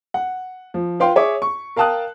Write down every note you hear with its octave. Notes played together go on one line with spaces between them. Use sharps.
F#5
F3
F4 B4 F5 G5 C6
G#4 C#5 E5 D6
C#6
A#4 F5 G5 A5 D#6 F#6